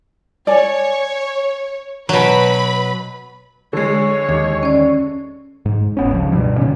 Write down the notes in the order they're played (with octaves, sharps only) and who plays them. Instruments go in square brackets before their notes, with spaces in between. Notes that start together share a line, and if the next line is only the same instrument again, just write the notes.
[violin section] C#5 [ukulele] D5 G#5
[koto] B2 F#3 [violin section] B4 B5
[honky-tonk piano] D3 G#3 [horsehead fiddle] C#5
[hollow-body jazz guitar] D#2
[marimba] C#4 D5
[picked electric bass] G#2
F#1 B3 C#4
C#2 F3
G2 B2
A#2 D3 C#4